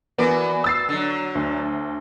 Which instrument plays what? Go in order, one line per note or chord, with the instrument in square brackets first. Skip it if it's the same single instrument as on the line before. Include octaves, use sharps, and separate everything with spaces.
[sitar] E3 F#4 D5 [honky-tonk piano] B3 A#4
[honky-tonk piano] E6 A6 C7
[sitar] D3 F#3
[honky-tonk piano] D2